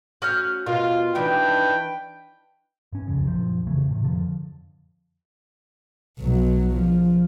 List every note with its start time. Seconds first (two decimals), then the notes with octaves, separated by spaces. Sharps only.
0.22 C#4 F#4 F6 G6
0.66 B2 F4 A#4
1.15 D#3 E3 D4 B4 G5
2.92 G2 C#4
3.08 C2 F2 C#3
3.27 A#1 F#2 F3
3.67 F2 C#3 E3 A3
3.90 A2 C3
4.04 F2 D3 F3
6.19 B1 F#3
6.72 F3